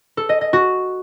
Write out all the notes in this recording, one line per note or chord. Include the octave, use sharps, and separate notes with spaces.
A4
D#5
D#5
F#4